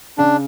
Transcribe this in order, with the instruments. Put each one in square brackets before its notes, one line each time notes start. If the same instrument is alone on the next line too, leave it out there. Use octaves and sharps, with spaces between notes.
[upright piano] C#3 [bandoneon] D4